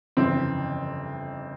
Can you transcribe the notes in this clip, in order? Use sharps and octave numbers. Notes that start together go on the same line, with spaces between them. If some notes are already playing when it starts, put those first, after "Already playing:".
G1 F2 C#3 E3 C4